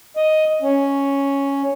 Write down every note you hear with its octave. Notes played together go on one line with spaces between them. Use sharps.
D#5
C#4